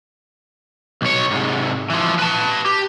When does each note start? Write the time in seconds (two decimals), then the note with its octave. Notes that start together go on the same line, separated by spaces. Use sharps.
1.02 B1 C#5
1.30 G#2 C3
1.90 E3 F3
2.19 B4 A5
2.66 G4